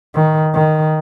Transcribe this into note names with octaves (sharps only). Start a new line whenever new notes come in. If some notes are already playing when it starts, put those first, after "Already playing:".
D#3
D#3